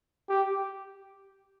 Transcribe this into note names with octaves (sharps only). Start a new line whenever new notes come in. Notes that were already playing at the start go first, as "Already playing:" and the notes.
G4